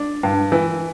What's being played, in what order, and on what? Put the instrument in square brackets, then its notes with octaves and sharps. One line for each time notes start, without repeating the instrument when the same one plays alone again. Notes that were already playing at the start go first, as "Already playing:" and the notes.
Already playing: [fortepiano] D4
G2
E3